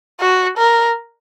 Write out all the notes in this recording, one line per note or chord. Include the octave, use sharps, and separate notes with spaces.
F#4
A#4